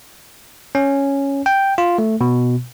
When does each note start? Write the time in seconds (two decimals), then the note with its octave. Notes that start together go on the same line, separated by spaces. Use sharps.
0.75 C#4
1.46 G5
1.78 F4
1.98 A3
2.21 B2